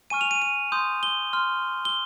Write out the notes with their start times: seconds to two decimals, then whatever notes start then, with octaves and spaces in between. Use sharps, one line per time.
0.10 G#5 C#6 F6 D#7
0.21 F7
0.31 D#7
0.42 D#7
0.72 C6 D#6 G6
1.03 G7
1.33 C6 F6
1.85 G7